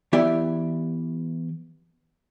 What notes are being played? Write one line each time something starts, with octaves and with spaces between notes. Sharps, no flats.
E3 B3 E4 G4 D5 E5